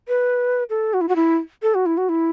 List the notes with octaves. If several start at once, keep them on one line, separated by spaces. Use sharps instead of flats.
B4
A4
F#4
E4
F#4
E4
A4
F#4
E4
F#4
E4